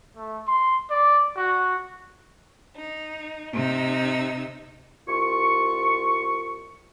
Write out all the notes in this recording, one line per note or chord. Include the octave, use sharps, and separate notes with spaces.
A3
C6
D5
F#4
D#4
C3 D#4 E6
C2 F4 C#6